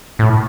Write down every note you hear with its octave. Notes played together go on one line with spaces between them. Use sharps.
A2